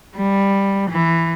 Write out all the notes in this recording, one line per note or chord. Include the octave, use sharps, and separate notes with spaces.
G3
E3